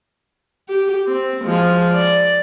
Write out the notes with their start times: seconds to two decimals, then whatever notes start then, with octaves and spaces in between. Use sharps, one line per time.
0.69 G4
1.07 C4
1.45 F3 G#3
1.92 D5